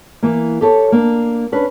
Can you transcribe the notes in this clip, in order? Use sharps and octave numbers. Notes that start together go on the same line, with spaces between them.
E3 A#3
G4 A4 C#5
A#3 D4
C#4 D4 B4